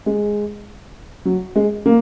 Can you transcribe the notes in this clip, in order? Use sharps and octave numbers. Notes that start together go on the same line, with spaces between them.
G#3
F#3
G#3
A#3